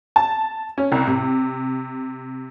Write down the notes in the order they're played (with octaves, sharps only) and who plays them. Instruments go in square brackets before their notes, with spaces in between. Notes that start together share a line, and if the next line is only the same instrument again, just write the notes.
[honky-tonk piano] A5
C#4
C2
C3